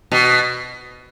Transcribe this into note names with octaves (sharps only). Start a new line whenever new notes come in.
B2